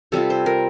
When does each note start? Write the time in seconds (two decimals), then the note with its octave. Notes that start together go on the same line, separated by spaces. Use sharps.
0.12 C3 G3 C4 F4 A4
0.30 C5
0.46 A#4